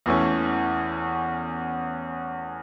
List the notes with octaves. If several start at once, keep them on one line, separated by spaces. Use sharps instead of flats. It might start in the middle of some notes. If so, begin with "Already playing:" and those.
E2 E3 A3 C#4